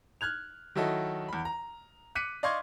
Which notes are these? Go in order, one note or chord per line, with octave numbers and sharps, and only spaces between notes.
F6 F#6 G#6 F7
D#3 F#3 E4 F#4 A4 D#5
E2 B5
A#5
D6 F#6 B6 C#7 D#7
D5 D#5 F5 C6 C#6 G#6